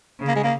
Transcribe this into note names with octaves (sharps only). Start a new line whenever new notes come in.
C#3
A#3
G#3
A#3